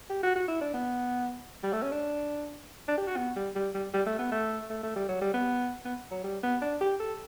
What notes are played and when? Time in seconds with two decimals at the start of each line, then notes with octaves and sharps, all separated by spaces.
0.10 G4
0.23 F#4
0.36 F#4
0.48 E4
0.61 D4
0.74 B3
1.63 G3
1.73 A3
1.83 C#4
1.92 D4
2.88 D4
2.98 G4
3.07 F#4
3.17 B3
3.36 G3
3.56 G3
3.75 G3
3.94 G3
4.06 A3
4.19 B3
4.32 A3
4.70 A3
4.83 A3
4.96 G3
5.09 F#3
5.21 G3
5.34 B3
5.85 B3
6.11 F#3
6.24 G3
6.43 B3
6.62 D4
6.81 G4
7.00 A4